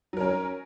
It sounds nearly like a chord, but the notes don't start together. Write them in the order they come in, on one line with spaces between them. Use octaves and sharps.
F#3 A#4 C#4